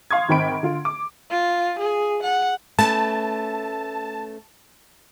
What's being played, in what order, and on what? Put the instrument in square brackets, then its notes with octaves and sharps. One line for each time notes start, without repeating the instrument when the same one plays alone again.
[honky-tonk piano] F5 C6 C#6 D#6 G#6
G#1 D#3 C4 G5 B5 D7
D3 F4
D6
[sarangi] F4
G#4
F#5
[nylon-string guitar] A3 B3 C#4 [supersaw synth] A5